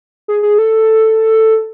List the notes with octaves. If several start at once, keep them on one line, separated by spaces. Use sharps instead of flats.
G#4
G#4
A4